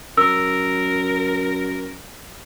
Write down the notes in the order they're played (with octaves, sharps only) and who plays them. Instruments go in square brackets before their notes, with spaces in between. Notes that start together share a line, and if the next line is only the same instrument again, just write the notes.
[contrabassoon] F#2 [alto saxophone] A#4 [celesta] E6